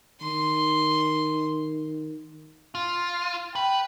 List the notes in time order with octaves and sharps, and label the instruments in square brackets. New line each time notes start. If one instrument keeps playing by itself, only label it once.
[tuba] D#3 [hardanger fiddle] C6
[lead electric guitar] F4
[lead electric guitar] B4 [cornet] G5